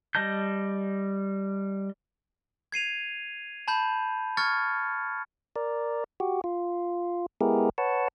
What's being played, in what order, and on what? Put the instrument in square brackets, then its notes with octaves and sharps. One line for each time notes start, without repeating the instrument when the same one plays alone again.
[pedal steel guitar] G3 D#5 A5 G6
[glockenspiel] G#6 C7 D#7 F7
A5 B5 G6
C#6 F6 G#6 A6 C#7
[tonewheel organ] A#4 D5
F#4 G4
F4
G#3 B3 E4 G4 G#4 A#4
B4 C#5 F#5 A5